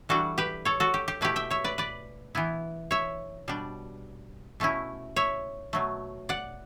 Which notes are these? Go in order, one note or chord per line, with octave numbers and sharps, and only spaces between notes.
E3 G3 D4 F#4 A4
G4 B4
A4 C#5
F#4 A4
G4
G4
B2 A3 E4 G4 B4
E5 G5
C#5 E5
B4 D5
B4 D5
E3 B3 E4
C#5 E5
B2 G3 D4
B2 A3 C#4 E4
C#5 E5
B2 F#3 A3
D5 F#5